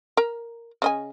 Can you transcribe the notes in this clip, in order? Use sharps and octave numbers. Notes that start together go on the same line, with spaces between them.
A#4 A#5
C#3 D#5 G#5